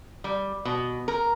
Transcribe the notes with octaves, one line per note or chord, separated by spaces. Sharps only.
G3
B2
A#4